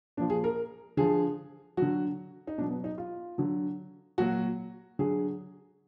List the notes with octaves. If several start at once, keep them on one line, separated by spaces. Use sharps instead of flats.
A#2 F3 D4
G#4
A#4
D3 F3 G#4
D3 F#3 F#4
D#4
B2 F#3 D4
B3
D#4
F4
D3 F#3
A#2 F#3 F#4
D3 F#3 G#4